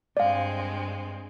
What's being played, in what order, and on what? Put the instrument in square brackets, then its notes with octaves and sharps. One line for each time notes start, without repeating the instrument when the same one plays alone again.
[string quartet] G2 G#3 C4 [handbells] D5 F5